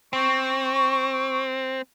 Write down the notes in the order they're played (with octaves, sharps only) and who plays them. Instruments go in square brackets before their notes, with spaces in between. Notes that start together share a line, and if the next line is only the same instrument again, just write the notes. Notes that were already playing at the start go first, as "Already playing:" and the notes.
[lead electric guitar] C4 [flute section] C#6